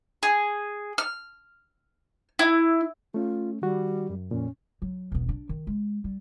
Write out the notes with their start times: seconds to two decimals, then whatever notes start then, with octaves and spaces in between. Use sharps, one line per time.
0.23 G#4
0.98 F6
2.39 E4
3.14 A3 C#4 F4
3.62 D#3 G3 F#4
4.10 F#2
4.31 F2 A#2 C#4
4.82 F#3
5.12 E1 B3
5.29 D4
5.49 D#3
5.67 G#3
6.04 G3